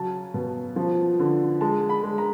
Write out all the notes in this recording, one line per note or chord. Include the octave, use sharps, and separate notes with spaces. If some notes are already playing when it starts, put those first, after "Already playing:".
Already playing: C#3 F#3 A5
B2
F3
D3
G#3 A5
B5
G#3
A#5